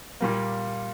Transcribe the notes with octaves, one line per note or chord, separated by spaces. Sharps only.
A#2 G3 A#3